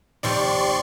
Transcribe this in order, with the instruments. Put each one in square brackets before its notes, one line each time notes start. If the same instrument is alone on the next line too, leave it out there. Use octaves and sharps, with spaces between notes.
[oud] D#2 C3 F3 [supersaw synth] D5 C6 C#6